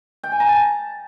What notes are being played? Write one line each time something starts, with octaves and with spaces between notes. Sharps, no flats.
G5
G#5
A#5
A5